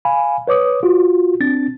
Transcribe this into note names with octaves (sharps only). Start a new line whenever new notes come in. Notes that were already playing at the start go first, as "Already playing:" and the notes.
F5 G#5 B5
B4 C#5 D6 D#6
F4 F#4
C4 D4 A6